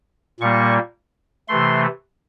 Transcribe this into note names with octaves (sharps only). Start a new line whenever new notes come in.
A#2 G3 A#3 C#6
C3 E3 A3 C6